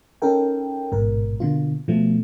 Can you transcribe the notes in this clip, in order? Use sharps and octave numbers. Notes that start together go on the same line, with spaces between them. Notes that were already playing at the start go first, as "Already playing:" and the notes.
C#4 D#4 A4 A#4 G5
A1 G#2 B2 A#4
B2 D3 A#3 F4
B2 F3 A3